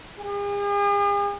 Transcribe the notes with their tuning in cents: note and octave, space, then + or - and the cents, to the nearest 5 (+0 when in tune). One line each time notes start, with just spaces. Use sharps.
G#4 -45